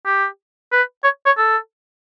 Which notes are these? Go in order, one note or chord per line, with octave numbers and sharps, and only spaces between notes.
G4
B4
C#5
C#5
A4